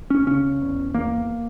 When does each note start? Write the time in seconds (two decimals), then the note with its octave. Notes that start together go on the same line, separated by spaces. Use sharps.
0.10 C#4
0.27 C#3 C#4
0.61 E2
0.94 E2 A#3